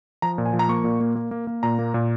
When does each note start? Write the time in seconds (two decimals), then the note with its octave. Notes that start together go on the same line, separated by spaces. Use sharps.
0.22 F3 A#5
0.38 A#2
0.46 G#5
0.53 F3
0.59 A#5
0.69 A#3 C#6
0.84 A#2
1.00 A#3
1.15 A#3
1.31 A#3
1.47 A#3
1.63 A#2 A#5
1.79 A#3
1.94 A#2